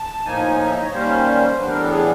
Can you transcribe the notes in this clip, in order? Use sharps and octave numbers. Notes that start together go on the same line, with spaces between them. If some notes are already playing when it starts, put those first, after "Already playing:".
Already playing: A5
A2 F3 A#3 D#4 G#5
G#5
E5
D#5
C#5
D#3 G3 A#3 C#4 C5
A2 E3 G3 B3 D4 B4
A#4
A4
G#4